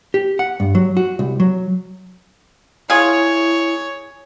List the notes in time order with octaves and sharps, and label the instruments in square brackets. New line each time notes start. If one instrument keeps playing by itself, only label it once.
[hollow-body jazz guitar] G4
F#5
G2
F#3
F#4
C2
F#3
[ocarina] E4 [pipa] F4 G#4 [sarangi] C#5